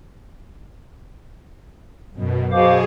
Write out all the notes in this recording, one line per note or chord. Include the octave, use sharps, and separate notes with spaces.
F#2 B2
B2 G#4 C5 F5 D6